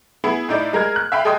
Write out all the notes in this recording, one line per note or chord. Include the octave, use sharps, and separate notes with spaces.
B3 E4 G#4
A2 D#4 E4 D5 G6
G#3 A#4 F6 G#6
F#6
E5 F5 G5 B5
G#4 A4 D#5 G5 C6 D#6